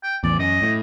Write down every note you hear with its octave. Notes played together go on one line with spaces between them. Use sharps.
G5
A1 E2 D5
F#2 D#5
A2